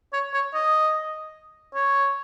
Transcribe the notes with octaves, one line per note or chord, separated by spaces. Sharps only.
C#5
C#5
D#5
C#5